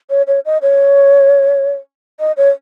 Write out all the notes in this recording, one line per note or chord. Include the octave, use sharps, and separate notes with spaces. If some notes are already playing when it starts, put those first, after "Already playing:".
C#5
C#5
D#5
C#5
D#5
C#5